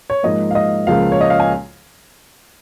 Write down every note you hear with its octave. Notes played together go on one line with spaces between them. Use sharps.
C#5
G#2 F3 A#3 D#5
F5
D#5
C#2 C#3 F3 A#3 F5
C#5
D#5
F5
G#5